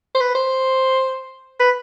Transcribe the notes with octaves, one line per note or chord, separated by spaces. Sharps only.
C5
B4
C5
B4